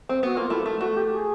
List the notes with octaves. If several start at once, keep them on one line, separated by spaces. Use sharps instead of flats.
C4
B3 F#4
A#3 F4
A3 E4
A3
A3 F#4
G4
G#4